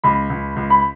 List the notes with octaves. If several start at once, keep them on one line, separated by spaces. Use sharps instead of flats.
C#2 B5
C#2
C#2
B5